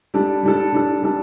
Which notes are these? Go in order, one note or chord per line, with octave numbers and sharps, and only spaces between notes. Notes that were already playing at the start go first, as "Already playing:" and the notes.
G3 D4 A4
G3 D4 A4
G3 D4 A4
G3 D4 A4